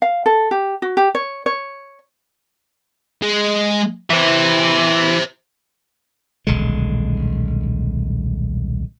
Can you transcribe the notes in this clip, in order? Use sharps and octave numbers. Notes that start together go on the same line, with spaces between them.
F5
A4
G4
F#4
G4
C#5
C#5
G#3
E3 C5 E5
D#1 B1 D3 G#3